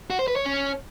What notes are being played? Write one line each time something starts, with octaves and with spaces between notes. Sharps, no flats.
F#4
C5
B4
C#5
C#4